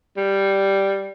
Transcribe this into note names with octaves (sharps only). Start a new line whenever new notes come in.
G3